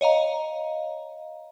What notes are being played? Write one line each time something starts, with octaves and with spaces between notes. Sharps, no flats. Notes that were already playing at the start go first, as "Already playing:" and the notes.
C#5 D#5 F5 A#5